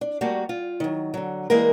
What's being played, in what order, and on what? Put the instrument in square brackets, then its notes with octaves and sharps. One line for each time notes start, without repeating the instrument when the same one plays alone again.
[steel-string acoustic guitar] D4
G3 A3 A#3 F#4
F4
D#3 F#3
D3 F#3
E3 G3 G#3 A#3 G#4 A#4